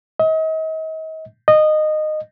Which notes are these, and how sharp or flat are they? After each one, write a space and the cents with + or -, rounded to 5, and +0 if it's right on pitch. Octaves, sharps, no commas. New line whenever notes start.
D#5 +40
D#5 -15